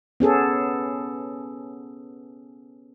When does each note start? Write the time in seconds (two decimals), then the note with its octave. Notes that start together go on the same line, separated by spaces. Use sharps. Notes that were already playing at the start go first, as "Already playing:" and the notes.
0.20 B3 C#4 G#4 A4